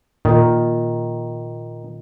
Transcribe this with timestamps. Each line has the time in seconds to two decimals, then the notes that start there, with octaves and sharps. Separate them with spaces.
0.25 A#2 D#3 A#4